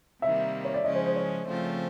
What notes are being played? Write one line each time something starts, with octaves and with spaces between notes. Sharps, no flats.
C3 D#3 G3 A#3 E5
C#5
D5
C#3 F3 G#3 C#4 D#5
C5
C5
C#5
C#3 F3 A3 C4 F4